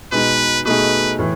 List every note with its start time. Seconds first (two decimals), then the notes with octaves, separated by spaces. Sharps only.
0.12 B2 G#3 D#4 B4
0.65 B2 A3 D#4 G#4 B4
1.19 A2 E3